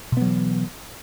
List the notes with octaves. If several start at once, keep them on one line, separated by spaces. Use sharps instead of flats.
B2 E3 F#3 B3